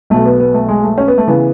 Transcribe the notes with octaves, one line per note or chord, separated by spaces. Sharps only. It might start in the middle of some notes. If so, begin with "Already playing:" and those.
B1 B2 A3
B3
B3
A3
G#3
A3
C#4
B3
A3
C#3 E3 B3